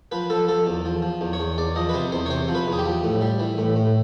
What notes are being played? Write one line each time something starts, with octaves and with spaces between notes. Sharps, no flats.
F3 B4
F3 A4
F3 A4
E2
F3
F3
E2
C#5
E2
E2 D5
F3 D#5
B4
C3 C5
E2 C5
C#5
C3 C5
F3
B4
E2
G#4
G4
F3
A2
G3
E3
A2
A2